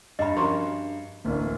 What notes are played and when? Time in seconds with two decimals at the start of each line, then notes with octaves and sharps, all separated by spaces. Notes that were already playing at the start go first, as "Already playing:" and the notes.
0.19 G2 D#5 B5
0.37 F3 C#4 F#4 A#4 A#5 C6
1.25 D1 A1 A#3 D4